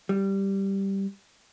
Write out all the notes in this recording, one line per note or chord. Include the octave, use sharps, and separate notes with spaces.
G3